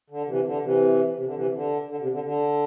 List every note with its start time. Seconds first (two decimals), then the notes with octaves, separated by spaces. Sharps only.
0.10 D3
0.27 C3 E3
0.45 D3
0.63 C3 E3
1.15 C3
1.25 D3
1.34 C3 E3
1.53 D3
1.88 D3
2.00 C3
2.12 D3
2.24 D3